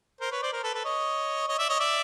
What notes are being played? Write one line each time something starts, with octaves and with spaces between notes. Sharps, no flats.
A#4 C5
B4 C#5
C5 D5
A#4 C5
A4 B4
A4 B4
C#5 D#5
C#5 D#5
D5 E5
C#5 D#5
D5 E5